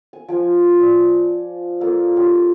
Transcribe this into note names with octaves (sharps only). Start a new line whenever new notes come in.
G#5
F3 G#5
D5
A#3 F4 A4
C#4 F4 G4